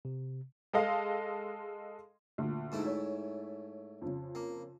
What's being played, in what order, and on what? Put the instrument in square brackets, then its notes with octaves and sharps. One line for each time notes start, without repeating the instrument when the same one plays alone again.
[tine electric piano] C3
[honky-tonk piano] G#3 A4 D#5 F5
D2 A#2
[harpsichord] G#2 A3 E4
[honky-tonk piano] C#5
F2 C#3
[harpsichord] A#3